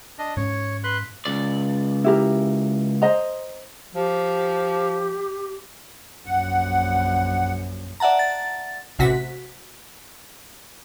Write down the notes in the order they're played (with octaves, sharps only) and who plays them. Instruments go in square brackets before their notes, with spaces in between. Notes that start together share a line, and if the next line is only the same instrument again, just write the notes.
[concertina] D4 D#5
[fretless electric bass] G#2 C#4 [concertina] C#5
[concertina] B4 C6 F#6
[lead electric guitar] C#2 D5
[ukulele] E4 G4 A#4
C5 D#5 A#5
[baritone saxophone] F3 [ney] G4
[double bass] A#1 F#2 [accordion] F#5
[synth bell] D5 E5 F#5 A5 A#5
A6
[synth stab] A1 C3 F#4 B6